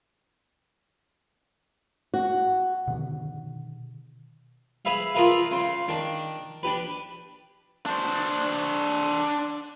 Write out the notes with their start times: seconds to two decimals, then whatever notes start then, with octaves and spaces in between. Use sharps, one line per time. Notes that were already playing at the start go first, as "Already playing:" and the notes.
2.14 F#4
2.87 B2 D3 D#3
4.85 G#4 B4 E5 F5
5.14 F4 G#4 A#4 B4 E5 F5
5.51 C#3 C6
5.88 D#3 D4
6.63 D4 G4 B4
7.86 D4 C5